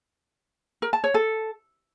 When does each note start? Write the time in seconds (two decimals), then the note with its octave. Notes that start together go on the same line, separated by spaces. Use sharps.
0.82 A#4
0.93 A5
1.04 C#5
1.14 A4